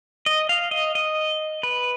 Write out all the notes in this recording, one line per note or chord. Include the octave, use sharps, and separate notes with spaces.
D#5
F5
D#5
D#5
B4